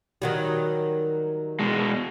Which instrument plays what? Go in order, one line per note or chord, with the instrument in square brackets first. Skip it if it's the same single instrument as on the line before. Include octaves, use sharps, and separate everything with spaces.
[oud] D#3 F#3 G3
[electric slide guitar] B2 G#3